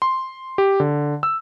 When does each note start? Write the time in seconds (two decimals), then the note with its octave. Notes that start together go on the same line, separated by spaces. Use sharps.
0.02 C6
0.58 G4
0.80 D3
1.23 E6